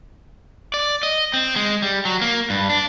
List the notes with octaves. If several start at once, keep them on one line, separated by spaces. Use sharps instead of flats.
D5
D#5
C4
G#3
G3
F#3
A#3
G2
D4